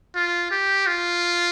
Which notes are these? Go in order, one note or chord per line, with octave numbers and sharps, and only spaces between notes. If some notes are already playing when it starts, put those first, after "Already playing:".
F4
G4
F4